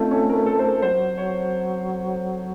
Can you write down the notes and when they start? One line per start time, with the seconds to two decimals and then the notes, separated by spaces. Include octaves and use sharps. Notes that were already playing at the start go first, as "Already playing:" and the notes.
Already playing: A3 C4 C#4 D#4 F4
0.11 C#4
0.29 A#4
0.46 A4
0.59 C5
0.64 A#4
0.82 F#3 C5
1.18 C#5